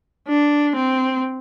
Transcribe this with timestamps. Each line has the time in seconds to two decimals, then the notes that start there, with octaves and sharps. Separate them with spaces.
0.28 D4
0.76 C4